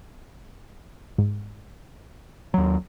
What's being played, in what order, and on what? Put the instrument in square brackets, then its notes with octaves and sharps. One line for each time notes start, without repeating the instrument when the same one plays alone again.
[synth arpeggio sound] G#2
[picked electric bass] D#2 F#3